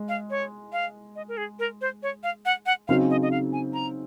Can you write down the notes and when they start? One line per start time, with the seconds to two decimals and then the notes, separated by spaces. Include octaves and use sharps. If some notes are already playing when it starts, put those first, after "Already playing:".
Already playing: G#3
0.09 F5
0.30 C#5
0.73 F5
1.16 D#5
1.28 A#4
1.37 G#4
1.59 A#4
1.81 C5
2.03 C#5
2.23 F5
2.45 F#5
2.66 F#5
2.88 C#3 F#3 C4 D#4 G#4 F5
3.10 D#5
3.22 D#5
3.31 F5
3.53 G#5
3.73 A#5